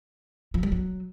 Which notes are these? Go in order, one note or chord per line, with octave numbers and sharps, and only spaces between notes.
F3
G3
F#3